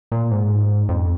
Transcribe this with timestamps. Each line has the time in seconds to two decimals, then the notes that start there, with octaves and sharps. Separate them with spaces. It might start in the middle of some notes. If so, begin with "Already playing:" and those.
0.12 A#2
0.31 G#2
0.89 F2